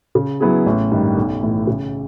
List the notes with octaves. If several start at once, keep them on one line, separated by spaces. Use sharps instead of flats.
C#3
F#3 B3 E4 G#4
A1
G2 D#3
B1
A2 E3
C#3